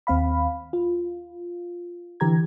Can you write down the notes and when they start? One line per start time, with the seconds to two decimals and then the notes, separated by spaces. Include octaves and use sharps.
0.07 D#2 C4 F5 B5
0.73 F4
2.20 D3 E3 G4 A#5 G#6